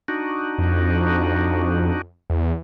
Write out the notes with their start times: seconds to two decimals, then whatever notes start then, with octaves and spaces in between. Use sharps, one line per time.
0.08 D4 D#4 F#4
0.58 F2
2.30 E2